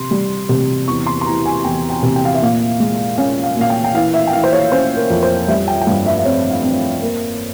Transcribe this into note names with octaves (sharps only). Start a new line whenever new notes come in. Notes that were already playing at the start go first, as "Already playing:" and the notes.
Already playing: C3 C6
G3
C3
E2 C#6
C6
C6
E3 A#5
G#5
E2 G5
G5
C3
G5
F5
E5
A#2 F5
G#3
C#4 F5
F5
A#2
F5
G5
G5
E3 F5
E5
G5
E3 F5
C5
C#5
C#4 C5
A#4
F2
C5
G3 E5
G5
G5
G2 F5
E5
E5
C4 C#5
F5
C4
A#3